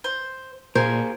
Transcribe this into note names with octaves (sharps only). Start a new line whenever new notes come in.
C5
A#2 F4 G#4 A#4 C5 G#5